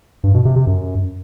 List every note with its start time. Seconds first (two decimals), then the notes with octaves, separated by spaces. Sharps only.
0.24 G2
0.34 B2
0.45 C3
0.56 C3
0.67 F#2